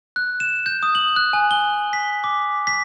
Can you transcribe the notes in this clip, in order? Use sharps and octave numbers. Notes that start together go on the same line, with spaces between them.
F#6
E7
G6
D#6
F#7
F#6
G#5
G7
B6
D6
B6